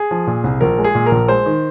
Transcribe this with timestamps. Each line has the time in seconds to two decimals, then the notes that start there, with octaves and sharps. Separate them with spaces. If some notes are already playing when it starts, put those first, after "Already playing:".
Already playing: G#4
0.11 F3
0.27 A#2
0.44 C2
0.61 A#1 A#4
0.78 G#3
0.84 G#4
0.95 A#2
1.06 A#4
1.11 A#1
1.28 G#3 C5
1.46 D#3